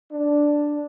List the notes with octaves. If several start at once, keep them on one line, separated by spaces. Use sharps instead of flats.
D4